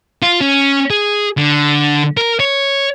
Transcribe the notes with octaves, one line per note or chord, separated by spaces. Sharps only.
F4
C#4
G#4
D3
A#4
C#5